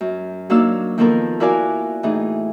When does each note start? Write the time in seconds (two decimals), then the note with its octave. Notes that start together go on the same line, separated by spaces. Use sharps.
0.01 F#2
0.50 F#3 A#3 D4 D#4 F5 E6
0.98 D#3 F3 A#3 B3 A4 A#4
1.40 E4 F#4 A#4 D5 F5 G#5
2.03 A2 E3 D#4 G#4